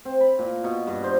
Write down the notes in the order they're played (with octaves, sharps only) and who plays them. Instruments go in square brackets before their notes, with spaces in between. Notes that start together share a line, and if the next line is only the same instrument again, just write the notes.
[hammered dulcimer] C4
B5
A#2
B2
G2
C5